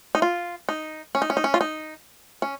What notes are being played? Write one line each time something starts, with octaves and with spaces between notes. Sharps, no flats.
D#4
F4
D#4
C#4
D#4
C#4
D#4
C#4
F4
D#4
C#4